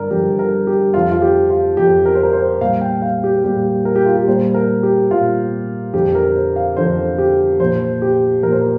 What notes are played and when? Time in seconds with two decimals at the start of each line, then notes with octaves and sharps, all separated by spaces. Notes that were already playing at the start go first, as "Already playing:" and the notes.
Already playing: G2 D3 A#4 D5
0.11 G2 D3 F3 G4
0.39 A#4
0.67 G4
0.94 F2 F3 F4
1.11 F4
1.22 G4
1.50 F4
1.77 F2 F3 G4
2.06 A#4
2.15 C5
2.23 A#4
2.33 C5
2.60 A#2 G3 F5
2.81 G5
3.02 F5
3.24 G4
3.44 A#2 G3 G4
3.85 A#4
3.96 G4
4.06 F4
4.16 G4
4.27 A#2 G3 C5
4.54 A#4
4.83 G4
5.11 A#2 G3 F4
5.94 F2 D3 F3 G4
6.15 A#4
6.36 C5
6.56 F5
6.77 F2 D3 F3 C5
7.18 G4
7.60 A#2 F3 C5
8.02 G4
8.43 A#2 F3 A#4
8.52 C5
8.61 A#4